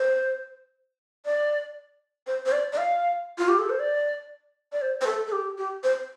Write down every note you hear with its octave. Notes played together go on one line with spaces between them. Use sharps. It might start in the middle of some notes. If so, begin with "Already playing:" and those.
Already playing: C5
D5
C5
C5
D5
D5
F5
F4
G4
A4
C5
D5
D5
C5
C5
A4
A4
G4
G4
C5